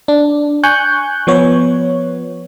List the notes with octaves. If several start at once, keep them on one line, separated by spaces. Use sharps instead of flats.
D4
G#5 C#6 F#6 G6
F3 B3 C#5